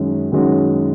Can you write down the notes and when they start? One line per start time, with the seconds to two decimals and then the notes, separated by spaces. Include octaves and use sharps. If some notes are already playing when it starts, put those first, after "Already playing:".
Already playing: F#2 D#3 G#3 C#4 F#4
0.32 F#2 D#3 G#3 C#4 F#4